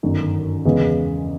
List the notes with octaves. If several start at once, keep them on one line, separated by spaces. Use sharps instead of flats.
G1 F#2 D#3
E2 C#3 E3 G#3 B3